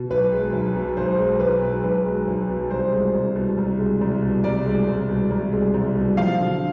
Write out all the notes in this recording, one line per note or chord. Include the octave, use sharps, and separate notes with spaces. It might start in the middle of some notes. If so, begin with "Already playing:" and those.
Already playing: B2
B1 B4
G#3
B1
B2
B1 C5
G#3
B1 B4
B2
B1 B4
G#3
B1
B2
C2 C5
G#3
C2
B2
C2
G#3
C2
B2
C2 D5
G#3
C2
B2
C2
G#3
C2
B2
F3 F5
D3